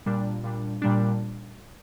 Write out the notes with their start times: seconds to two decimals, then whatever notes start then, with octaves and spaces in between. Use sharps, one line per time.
0.06 A#2 G3 D4
0.44 A#2 G3 D4
0.82 A#2 G3 D4